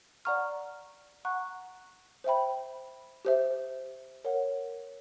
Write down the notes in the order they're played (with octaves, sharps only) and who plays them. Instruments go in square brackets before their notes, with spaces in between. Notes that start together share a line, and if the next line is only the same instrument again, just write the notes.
[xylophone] D5 F#5 A#5 C#6 F6
F#5 A#5 C#6 F#6
C5 E5 G5 B5
G4 C5 E5
A#4 C#5 F#5